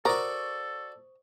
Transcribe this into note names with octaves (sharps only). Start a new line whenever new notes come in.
F#4 A4 A#4 C5 D5 C#6 D#6